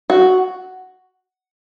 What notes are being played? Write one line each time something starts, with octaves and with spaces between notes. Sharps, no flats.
F#4